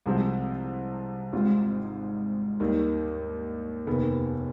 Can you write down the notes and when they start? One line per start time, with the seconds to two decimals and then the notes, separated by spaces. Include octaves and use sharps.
0.06 C2 C3 F3 G#3 C4
1.33 G#1 G#2 G3 C4 F4
2.60 D#2 D#3 G3
3.87 F1 D#2 D#3 B3